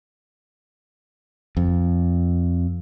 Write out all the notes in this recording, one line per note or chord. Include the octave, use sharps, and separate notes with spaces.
F2